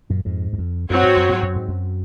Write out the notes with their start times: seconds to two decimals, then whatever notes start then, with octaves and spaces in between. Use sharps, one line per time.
0.10 F#2 A#2
0.25 F2 G#2
0.53 F#2
0.58 F2
0.90 F#2 F#3 C4 F#4 C#5
1.03 G#2
1.17 F#2
1.29 G#2
1.43 F#2
1.56 G#2
1.69 F#2